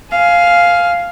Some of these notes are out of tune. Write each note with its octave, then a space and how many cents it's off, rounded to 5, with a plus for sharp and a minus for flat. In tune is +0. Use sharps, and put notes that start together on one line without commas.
F5 +0 G#5 +20